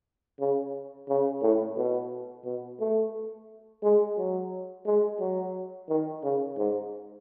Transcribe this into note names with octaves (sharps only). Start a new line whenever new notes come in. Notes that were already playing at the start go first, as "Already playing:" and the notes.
C#3
C#3
A2
B2
B2
A3
G#3
F#3
G#3
F#3
D#3
C#3
G#2